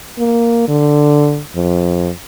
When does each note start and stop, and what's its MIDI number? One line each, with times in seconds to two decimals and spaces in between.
0.19 0.67 58
0.68 1.41 50
1.55 2.11 41